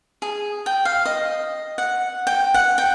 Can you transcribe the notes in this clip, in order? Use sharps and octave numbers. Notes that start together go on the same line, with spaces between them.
G#4
G5
F5
D#5
F#5
G5
F#5
G5